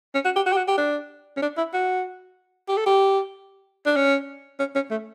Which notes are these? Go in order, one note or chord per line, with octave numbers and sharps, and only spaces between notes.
C#4
F#4
G4
F#4
G4
F#4
G4
D4
C#4
D4
E4
F#4
G4
A4
G4
D4
C#4
C#4
C#4
A3